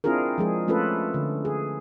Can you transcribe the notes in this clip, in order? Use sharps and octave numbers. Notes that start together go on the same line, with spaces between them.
C4 D4 E4 F4 G#4 A#4
F3 G#3 G#4
A3 C#4 F4 A4 B4
D3
G#4